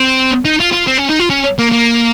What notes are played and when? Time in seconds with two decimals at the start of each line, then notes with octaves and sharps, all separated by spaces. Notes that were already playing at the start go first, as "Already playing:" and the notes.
Already playing: C4
0.45 D#4
0.60 F4
0.73 F4
0.87 C4
0.98 C#4
1.09 D#4
1.20 F4
1.30 C#4
1.59 A#3
1.72 A#3